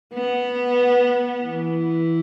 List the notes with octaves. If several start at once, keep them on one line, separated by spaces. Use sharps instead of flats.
B3
E3